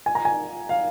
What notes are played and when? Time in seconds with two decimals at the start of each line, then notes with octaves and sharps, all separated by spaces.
0.06 G#5
0.15 A#5
0.25 G#5
0.69 F5